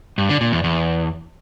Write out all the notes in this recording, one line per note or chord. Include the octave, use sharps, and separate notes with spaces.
G2
D3
A#2
E2
E2